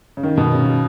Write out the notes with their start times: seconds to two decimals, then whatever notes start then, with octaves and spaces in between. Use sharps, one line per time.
0.17 C#3
0.23 D#3
0.37 B2
0.52 C#3